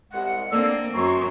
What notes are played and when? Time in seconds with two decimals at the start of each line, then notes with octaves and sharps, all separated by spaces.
0.12 C2 G#3 F#5
0.52 A#3 C4 D4 A4 E6
0.94 F#2 A#5 C6 C#6